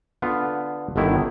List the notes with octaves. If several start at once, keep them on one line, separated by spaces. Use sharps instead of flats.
D3 B3 F4
G1 D3 D#3 E4